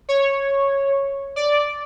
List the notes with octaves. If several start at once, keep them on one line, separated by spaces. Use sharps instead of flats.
C#5
D5